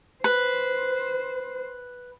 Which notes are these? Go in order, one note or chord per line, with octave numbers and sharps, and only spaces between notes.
B4 C5